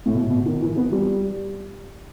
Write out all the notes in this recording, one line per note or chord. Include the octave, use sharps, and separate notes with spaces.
A2
B2
B2
D#3
E3
B3
G3